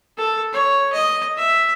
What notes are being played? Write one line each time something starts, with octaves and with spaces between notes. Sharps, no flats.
A4
C#5
D#5
E5